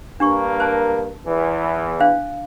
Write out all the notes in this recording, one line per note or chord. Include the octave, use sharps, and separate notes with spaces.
G2 A#3 D4 G4 A#4 C#6
C5 A5
E2 E3
D4 C5 F5